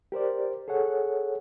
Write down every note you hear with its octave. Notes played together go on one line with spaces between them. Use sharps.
G4 A#4 C5 D5
G#4 A4 C#5 F#5